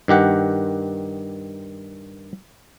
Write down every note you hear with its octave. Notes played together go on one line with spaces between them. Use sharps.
G2 D#3 G4 F#5